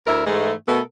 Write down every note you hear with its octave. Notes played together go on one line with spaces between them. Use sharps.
D2 E4 A#4 E5
G#2 E3 G#3 A3
B2 A3 B3 A4 A#4